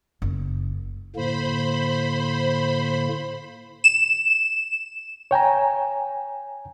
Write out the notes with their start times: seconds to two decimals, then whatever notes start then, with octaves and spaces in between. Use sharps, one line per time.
0.22 F#1
1.16 A2 D3 A#3 C5 B5
3.84 E7
5.31 C#5 G5 G#5 A#5